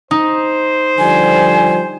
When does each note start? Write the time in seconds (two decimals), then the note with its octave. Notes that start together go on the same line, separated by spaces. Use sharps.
0.11 D#4 C5
0.99 D3 F3 G3 G#5